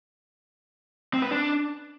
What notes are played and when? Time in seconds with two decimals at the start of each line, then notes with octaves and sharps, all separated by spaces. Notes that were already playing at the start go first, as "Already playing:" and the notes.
1.14 C4
1.22 B4
1.31 D4